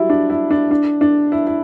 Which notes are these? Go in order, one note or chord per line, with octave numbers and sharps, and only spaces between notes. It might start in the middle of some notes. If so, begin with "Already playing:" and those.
Already playing: F#3 G3 E4
D4
E4
D4
D4
D4
E4
E4